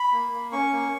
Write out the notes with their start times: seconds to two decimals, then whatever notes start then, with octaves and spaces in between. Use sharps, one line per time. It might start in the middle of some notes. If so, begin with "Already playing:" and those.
Already playing: B5
0.12 A#3
0.32 A#3
0.52 C#4 C#6
0.73 A#3